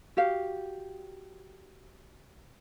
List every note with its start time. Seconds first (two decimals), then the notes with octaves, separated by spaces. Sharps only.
0.17 F#4 G4 F5